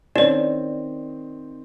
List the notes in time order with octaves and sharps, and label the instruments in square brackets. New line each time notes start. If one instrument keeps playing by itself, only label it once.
[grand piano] D#3 C4 [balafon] C#4 E4 [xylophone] C#5 E7 [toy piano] D5